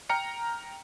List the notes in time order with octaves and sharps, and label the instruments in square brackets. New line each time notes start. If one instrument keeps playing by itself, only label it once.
[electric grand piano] G5 A#5 F6 C#7